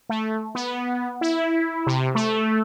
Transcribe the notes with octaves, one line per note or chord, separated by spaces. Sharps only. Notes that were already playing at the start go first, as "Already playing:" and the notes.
A3
B3
E4
C3
A3